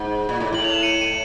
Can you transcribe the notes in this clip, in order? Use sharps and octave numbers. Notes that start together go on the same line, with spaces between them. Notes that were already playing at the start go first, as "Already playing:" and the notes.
Already playing: G#2
A#2
A2
A2 F#7
F7
E7
C#7 D#7
C#7 D#7